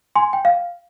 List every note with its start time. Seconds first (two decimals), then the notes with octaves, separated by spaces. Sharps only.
0.16 G#5 C6
0.33 G5
0.45 F5